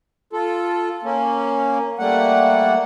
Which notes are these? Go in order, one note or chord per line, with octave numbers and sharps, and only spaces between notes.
F4 A4
A#3 C#4
G3 A3 A#3 F#5